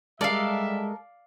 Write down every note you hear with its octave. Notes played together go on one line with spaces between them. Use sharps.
G3 G#3 A4 A#4 D5 E5 F5